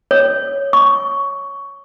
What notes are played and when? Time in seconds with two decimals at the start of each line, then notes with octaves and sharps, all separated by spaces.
0.11 C#5
0.73 C#6